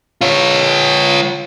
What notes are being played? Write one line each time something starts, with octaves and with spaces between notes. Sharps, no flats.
F4 C#5